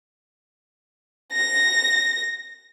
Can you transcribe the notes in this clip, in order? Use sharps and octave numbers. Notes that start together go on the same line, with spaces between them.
A#6